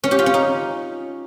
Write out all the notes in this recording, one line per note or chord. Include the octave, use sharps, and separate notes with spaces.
C#4
G4
F4
C#4
D#4